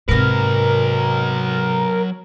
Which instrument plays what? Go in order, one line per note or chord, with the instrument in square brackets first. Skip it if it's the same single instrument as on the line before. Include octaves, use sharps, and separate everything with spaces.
[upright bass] G#2 C3 [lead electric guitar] F#3 B4 [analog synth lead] A#4